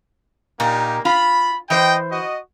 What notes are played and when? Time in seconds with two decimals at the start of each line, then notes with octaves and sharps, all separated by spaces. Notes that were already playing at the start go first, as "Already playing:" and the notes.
0.60 A#2 A#3 D#4 G4
1.05 F4 B5
1.70 E3 C5 D#5 G5
2.11 F#4 D#5